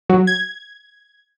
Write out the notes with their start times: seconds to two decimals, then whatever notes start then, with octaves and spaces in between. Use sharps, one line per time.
0.09 F#3
0.27 G#6